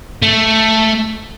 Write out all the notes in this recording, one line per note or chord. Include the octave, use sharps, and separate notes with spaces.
A3